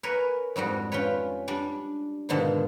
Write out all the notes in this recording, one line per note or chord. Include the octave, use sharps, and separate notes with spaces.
A#4 B4 C#5 G#5
F2 G#2 G3 F#4
C#4 F4 G4 B4 C#5
G3 D4
G#2 B2 D3 D#3 F3